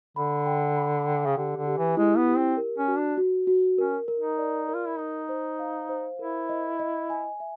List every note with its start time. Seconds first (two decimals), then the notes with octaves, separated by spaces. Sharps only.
0.16 D3 B5
0.46 G5
0.76 B5
1.07 G5
1.26 C#3
1.37 D3 G4
1.56 D3
1.67 G4
1.78 E3
1.97 G#3 E4
2.17 B3
2.27 G4
2.38 C4
2.57 A#4
2.78 C#4
2.88 F#4
2.97 D4
3.18 F#4
3.47 F#4
3.78 C#4 A#4
4.08 A#4
4.19 D#4
4.38 D5
4.68 A#4
4.75 F4
4.87 E4
4.98 D#4 A#5
5.29 C5
5.59 F5
5.89 C5
6.19 E4 A#4
6.49 D#5
6.79 D#5
7.10 G#5
7.40 E5